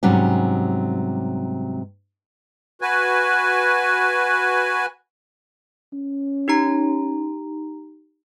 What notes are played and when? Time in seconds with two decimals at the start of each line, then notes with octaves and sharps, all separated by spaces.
0.03 G#2 C3 F#3 G3 C#4
2.82 F#4 B4 G#5
5.93 C#4
6.48 D#4 G4 A#5